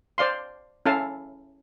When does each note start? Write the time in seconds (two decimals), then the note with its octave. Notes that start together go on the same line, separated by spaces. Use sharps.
0.18 C5 D5 F5 C6
0.86 C#4 E4 A4 F5 A5